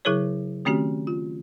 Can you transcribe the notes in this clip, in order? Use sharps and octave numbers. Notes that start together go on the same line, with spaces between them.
C#3 F#3 E4 G#4 A#4 C#5
D#3 A3 C4 C#4 F#4 G4
F4